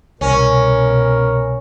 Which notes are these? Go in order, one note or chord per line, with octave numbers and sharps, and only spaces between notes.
C2 B2 C#4 A#4